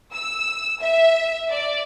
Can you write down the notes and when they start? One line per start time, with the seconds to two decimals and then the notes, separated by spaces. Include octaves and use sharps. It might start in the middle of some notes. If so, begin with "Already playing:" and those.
0.14 E6
0.80 E5
1.50 D5